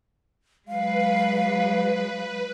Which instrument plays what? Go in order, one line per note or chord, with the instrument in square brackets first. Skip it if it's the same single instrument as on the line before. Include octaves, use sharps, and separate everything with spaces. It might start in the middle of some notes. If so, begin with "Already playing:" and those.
[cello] F#3 G#3 [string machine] B4 [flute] F5